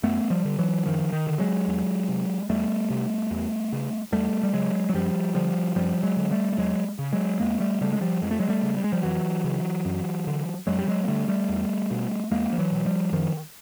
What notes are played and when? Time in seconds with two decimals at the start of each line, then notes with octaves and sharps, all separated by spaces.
0.03 F#2 A3 B3
0.30 F3 G3
0.45 D3
0.59 E3 F#3
0.86 F#2 D#3 F3
1.12 D#3
1.27 D3
1.39 F#3 G#3
1.67 E2
2.09 C3
2.49 E2 G3 A3
2.90 C3
3.31 E2
3.72 C#3
4.12 E2 G3 A3
4.43 G3
4.53 C#3 F#3 G#3
4.89 F#3
4.94 F#2 F3 G3
5.35 D3 F3 G3
5.76 F#2 F3 G3
6.03 F#3 G#3
6.17 D3
6.31 G3 A3
6.52 A3
6.58 E2 F#3 G#3
6.99 C#3
7.13 F#3 G#3
7.40 E2 G#3 A#3
7.60 G3 A3
7.81 C#3 G3 A3
7.93 G#3
8.01 F3 G3
8.22 F2 G#3
8.31 A3
8.40 F#3 G#3
8.49 G3 A3
8.63 C#3
8.77 G3
8.84 G#3
8.92 F3 G3
9.03 F2 E3 F#3
9.44 C#3
9.85 F#2
10.27 D3
10.67 F#2 F#3 G#3
10.79 G3
10.88 F#3 G#3
11.04 A#3
11.08 D3 G3 A3
11.28 G3 A3
11.49 E2
11.91 B2
12.31 E2 G#3 A#3
12.53 F3
12.58 E3 F#3
12.72 B2
12.85 F3 G3
13.12 F#2 D#3 F3